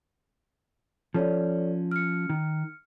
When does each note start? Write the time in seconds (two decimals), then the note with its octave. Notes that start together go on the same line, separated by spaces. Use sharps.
1.14 F3 C#4 A4 C#5 D5
1.91 F6 C#7
2.29 D#3